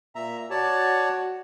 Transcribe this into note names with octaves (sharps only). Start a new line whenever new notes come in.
A#2 E5 A#5
F#4 C#5 D5 A5